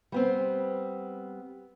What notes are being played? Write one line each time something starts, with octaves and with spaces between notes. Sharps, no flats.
G3 B3 C4